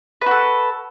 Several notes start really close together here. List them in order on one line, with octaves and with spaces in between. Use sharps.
B4 F#4 A4